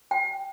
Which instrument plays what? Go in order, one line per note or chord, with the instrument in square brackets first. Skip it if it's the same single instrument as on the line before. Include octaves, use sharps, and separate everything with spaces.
[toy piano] G5